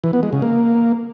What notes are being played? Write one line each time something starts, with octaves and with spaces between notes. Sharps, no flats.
E3
B3
G#3
C#3
A#3